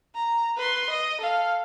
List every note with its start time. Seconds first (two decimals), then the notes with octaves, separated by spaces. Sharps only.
0.15 A#5
0.56 B4 C6
0.90 D#5
1.21 A4 F5